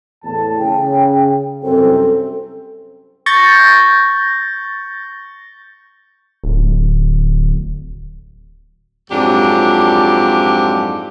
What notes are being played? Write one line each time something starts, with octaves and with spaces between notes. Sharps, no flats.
E2 A2 A5
C#3 G5
C2 F#2 C4 A4
C#6 G6 A6 A#6
D1
F2 G#2 F#3 D4 F4 G4